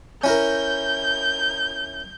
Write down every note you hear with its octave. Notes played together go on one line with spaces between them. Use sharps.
C#4 E4 A#4 G6